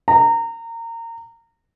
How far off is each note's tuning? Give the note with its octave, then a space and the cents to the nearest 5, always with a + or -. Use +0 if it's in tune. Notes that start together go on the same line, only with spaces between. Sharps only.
A#5 -25